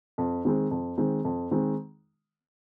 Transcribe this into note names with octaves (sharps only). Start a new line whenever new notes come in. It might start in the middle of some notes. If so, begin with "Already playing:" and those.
F2
D#3 G#3 C4
F2
D#3 G#3 C4
F2
D#3 G#3 C4